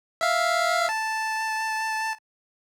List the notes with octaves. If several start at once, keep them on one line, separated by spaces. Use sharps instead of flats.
E5 F5
A5